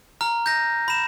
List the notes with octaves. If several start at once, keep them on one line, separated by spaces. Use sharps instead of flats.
A#5 F6
G6 A#6
B5 E7